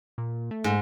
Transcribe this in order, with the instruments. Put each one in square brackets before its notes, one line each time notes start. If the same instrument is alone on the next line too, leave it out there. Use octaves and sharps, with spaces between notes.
[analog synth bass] A#2
A3
[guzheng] G#2